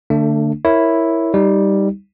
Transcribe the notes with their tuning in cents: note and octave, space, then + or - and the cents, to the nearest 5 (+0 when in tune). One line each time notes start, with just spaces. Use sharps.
D3 +0 A3 +30 D4 +0
E4 +0 A#4 +0 C#5 +0
G3 +0 D#4 +15